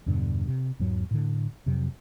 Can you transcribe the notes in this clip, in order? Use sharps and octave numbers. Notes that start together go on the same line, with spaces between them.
E2 G2 B2 D3
C3
E2 G#2 F#3
A2 D3
F2 C3 F#3